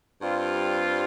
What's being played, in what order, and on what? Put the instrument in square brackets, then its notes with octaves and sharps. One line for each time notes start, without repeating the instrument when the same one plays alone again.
[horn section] G2 G3 C4 F4